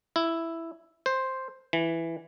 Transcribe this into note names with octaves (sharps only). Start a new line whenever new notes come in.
E4
C5
E3